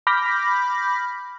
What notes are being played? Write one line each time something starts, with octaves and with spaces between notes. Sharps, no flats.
B5 D6 F6 G6 A#6 B6